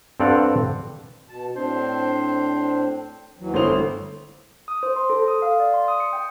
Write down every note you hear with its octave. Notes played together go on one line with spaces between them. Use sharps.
G2 C4 A4 D5 F5 F#5
B2 A5
A2 C4 D4 C5
D#2 E3 F#3
G1 A3 E4 C5 C6 F7
D#6
C5
C6
A4
D#6
F5
D5
C6
D#6
C#7
G5